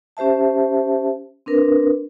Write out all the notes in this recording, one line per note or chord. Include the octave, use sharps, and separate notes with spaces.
C#4 G4 C5 E5 A5
C4 D4 A#4 B4